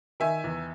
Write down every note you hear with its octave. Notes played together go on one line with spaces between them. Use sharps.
D#3 E5 G#5
E2